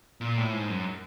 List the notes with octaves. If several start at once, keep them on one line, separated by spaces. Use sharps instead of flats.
A#2
A2
G#2
F#2